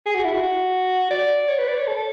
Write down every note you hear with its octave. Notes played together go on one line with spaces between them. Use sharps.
G#4
F#4
E4
F#4
D5
C#5
B4
D5
C#5
A4